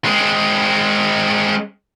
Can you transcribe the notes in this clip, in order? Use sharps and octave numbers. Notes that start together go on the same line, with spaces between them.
G#3 C4